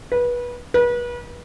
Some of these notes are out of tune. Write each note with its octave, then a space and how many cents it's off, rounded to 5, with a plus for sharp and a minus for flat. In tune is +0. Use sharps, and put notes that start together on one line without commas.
B4 -25
B4 -35